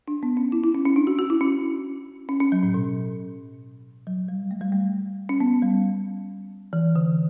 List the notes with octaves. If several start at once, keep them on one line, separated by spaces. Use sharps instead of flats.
D4
B3
C#4
E4
E4
C#4
C#4
D4
F#4
F#4
E4
C#4
C#4
C#4
F#3
A2
B2
F#3
G3
A3
G3
A3
C#4
B3
G3
E3
D3